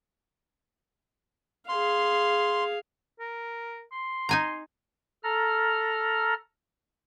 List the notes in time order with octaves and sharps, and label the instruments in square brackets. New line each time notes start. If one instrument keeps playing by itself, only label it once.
[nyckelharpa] G#4 F5 [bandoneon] C6
[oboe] A#4
C6
[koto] D#4 G#5 A#5
[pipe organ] A4 A#5 F6